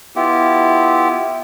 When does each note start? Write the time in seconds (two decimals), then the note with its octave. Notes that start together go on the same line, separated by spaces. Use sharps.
0.16 B3 E4 F4 G4